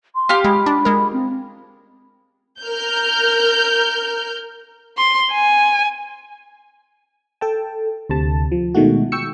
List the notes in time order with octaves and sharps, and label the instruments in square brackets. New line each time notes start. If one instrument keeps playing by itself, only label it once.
[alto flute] C6
[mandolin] F4 G4 F6
[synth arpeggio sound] G#3 [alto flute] B5
[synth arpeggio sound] D4
G#3 A#4
[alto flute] C4
[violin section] A#4 F6 G6
[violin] C6
G#5
[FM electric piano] A4 G5 A5
D2 C3 A5
F3
B2 D#3 G#3 A3 F#4
G5 C#6 E6 C#7